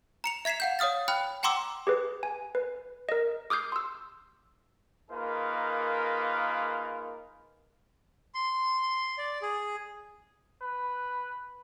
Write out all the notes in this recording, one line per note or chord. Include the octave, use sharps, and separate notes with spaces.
A#5 C#7 F7
E5 G#6 B6 C7 E7
F5 F#5 G6
C#5 F5 D#6 F6 A6
G5 B5 F6 F#6
F#5 G5 A#5 C6 D6 E6
G4 G#4 B4
G#5
B4
A#4 D#5
D6 D#6 F6 G6 C7
C6 E6
A#3 D#4 F4 G#4 A#4 B4
C6
D5
G#4
B4